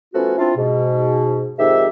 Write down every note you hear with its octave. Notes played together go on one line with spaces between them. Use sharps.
F3 A3 B3 C#4 F4 F#4
C4 D4 E4 F4
G#2 B2
F2 G#2 D#3 G4 E5